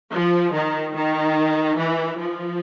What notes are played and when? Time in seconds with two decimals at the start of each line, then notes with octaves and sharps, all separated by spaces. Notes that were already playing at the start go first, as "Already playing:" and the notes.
0.12 F3
0.53 D#3
0.95 D#3
1.78 E3
2.19 F3